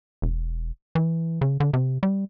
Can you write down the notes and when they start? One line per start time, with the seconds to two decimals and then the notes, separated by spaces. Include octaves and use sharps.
0.22 E1
0.95 E3
1.41 C#3
1.60 D3
1.73 C3
2.03 G3